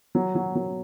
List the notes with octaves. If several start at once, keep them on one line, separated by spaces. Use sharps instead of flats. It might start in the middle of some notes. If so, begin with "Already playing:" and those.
F#3
F#3
F#3